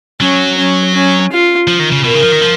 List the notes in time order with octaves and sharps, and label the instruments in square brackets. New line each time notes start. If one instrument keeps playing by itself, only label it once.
[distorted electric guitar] F#3 [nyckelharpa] C#4
[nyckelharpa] C#4
C#4
F4
[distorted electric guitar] F3
D#3
C#3
[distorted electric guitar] B2 [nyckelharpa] A#4
[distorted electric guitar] C#3
F3
D#3
F3